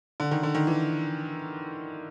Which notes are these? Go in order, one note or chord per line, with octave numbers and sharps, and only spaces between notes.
D3
D#3
D3
D#3
E3